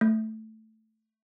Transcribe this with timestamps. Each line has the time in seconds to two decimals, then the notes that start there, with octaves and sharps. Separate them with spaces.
0.01 A3